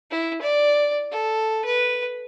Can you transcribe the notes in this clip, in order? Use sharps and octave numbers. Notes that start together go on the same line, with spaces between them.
E4
D5
A4
B4